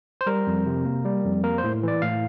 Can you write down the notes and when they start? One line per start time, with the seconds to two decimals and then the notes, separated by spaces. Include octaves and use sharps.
0.21 C5
0.26 G3 A#4
0.47 F2
0.66 C3
0.85 A#3
1.05 G3
1.24 F2
1.43 A#3 A#4
1.58 C5
1.64 A2
1.83 E3 D5
2.02 A2 F5